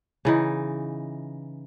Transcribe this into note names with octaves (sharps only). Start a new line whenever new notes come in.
C#3 E3 D#4